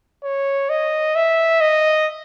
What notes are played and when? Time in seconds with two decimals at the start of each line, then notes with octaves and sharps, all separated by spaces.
0.24 C#5
0.70 D#5
1.16 E5
1.61 D#5